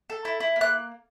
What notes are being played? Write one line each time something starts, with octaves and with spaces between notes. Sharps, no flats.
A4
E4
E4
A#3
F#6